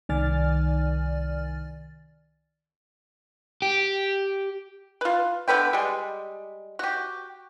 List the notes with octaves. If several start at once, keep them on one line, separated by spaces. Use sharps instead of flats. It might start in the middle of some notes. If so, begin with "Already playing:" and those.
C2 D#3 D5 G#5 F6 A6
G4
F4 B4
D3 B3 B4 G5
G3 G#3
F#4 G4